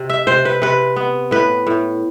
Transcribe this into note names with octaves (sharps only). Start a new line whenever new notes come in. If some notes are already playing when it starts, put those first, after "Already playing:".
Already playing: C3
E5
C3 C5
B4
C3 B4
B3
A2 B4
A2